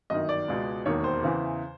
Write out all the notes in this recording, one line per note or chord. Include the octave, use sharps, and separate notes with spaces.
G1 F#2 D#3 D#5
D5
C#2 B2 G#3
E1 D#2 D#3 C#5
C5
E2 C#3 E3